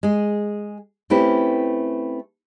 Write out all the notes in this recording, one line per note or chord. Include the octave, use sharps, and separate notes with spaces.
G#3 G#4
A3 C4 C#4 E4 G4 B4